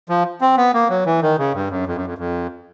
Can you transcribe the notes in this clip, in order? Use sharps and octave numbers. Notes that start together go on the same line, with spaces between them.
F3
C4
B3
A#3
F#3
E3
D#3
C#3
G2
F#2
F2
F#2
F2
F2